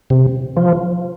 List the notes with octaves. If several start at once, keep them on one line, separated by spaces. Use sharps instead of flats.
C3
F3